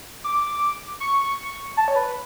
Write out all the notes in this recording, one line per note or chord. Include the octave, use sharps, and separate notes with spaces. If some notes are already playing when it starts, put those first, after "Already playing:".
D6
C#6
A5
C#5
B4